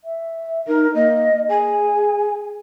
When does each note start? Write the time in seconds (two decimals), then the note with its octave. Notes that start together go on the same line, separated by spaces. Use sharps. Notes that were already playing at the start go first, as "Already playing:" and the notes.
0.04 E5
0.67 D#4 A#4
0.95 A#3 D#5
1.49 G#4 G#5